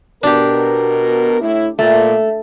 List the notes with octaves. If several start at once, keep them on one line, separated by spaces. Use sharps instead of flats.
B2 D4 G4 A#4
A2 E4
A#2 A3